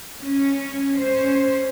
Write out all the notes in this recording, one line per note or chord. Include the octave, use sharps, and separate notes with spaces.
C#4
C#4 C5